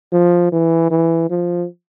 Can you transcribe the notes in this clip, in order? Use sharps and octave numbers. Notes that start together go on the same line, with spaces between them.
F3
E3
E3
F3